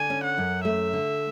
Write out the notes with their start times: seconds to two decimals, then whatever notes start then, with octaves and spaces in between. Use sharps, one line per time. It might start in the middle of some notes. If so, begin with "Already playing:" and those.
Already playing: D3 G#5
0.10 C#4
0.24 F#5
0.38 F#2
0.65 A3 E5
0.93 D3